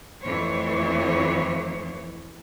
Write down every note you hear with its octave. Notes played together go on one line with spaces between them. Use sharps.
F2 E3 A3 C5 C#5